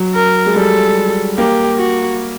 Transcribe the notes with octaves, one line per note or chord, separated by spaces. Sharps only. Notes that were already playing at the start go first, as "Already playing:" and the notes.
Already playing: F#3
A#4
G#3
G3 A4
A#3 G4
F#4